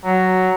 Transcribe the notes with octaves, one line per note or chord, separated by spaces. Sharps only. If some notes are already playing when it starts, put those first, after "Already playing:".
F#3